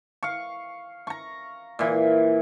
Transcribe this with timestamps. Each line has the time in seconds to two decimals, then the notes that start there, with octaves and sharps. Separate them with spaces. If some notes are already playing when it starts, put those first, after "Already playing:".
0.23 F5 C#6
1.07 A#5 C#6
1.79 A#2 E3